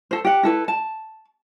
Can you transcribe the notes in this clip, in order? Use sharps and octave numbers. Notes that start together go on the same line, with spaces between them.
A4 C5
G4 F#5
E4 A4 B4
A5